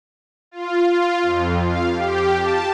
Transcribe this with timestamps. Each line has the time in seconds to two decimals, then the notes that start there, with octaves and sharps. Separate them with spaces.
0.51 F4
0.91 F4
1.22 F2
1.65 F5
1.93 G4
2.38 A5